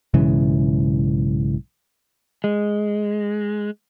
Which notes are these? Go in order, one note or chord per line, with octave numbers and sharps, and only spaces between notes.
B1 G#2 C#3 E3
G#3